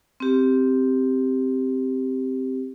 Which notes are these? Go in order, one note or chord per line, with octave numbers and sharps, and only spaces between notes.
C4 G4